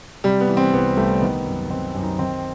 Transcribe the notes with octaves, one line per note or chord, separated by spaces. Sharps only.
C3 G3
B3
E3
C4
C2 B3
C2 A3
D#3 B3
F#2
D#3 C4
F#2
D#4
D#3 C4